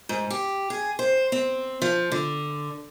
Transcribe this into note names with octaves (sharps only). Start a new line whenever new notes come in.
G#2
G4
G#4
C5
C4
F3
D3